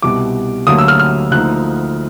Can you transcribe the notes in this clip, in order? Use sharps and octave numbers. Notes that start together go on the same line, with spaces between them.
C2 B2 G3 D6
D2 D3 F#3 A#3 D#6
E6
F6
F6
D2 D3 F3 A#3 D#4 F#6